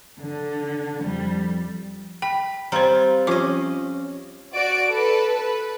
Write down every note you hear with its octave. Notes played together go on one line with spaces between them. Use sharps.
D3
F2 G3
G5 B5
G3 C4 F4 C5 A#5
F3 C#4 F4 D#5 D6
F#4 D5 D7
A4 B4
B4